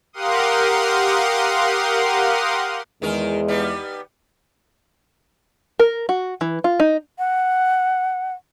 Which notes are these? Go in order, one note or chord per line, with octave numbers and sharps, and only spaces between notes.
G4 A#4 F5 F#5 C6 D#6
E2 D#3 G#3 D#4 A#4
G3 B3 D#4
A#4
F#4
E3
F4
D#4
F#5